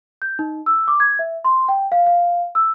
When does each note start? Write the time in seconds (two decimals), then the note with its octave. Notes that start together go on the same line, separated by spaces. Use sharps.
0.22 G6
0.39 D#4
0.66 E6
0.88 D6
1.00 G#6
1.19 E5
1.44 C6
1.68 G5
1.92 F5
2.07 F5
2.55 E6